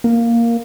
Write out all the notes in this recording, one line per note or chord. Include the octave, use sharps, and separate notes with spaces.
A#3